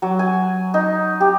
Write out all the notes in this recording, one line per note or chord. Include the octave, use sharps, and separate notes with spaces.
F#3
G#5
D#4
G4